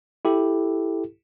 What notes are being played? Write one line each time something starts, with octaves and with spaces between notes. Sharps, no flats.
E4 G4 A4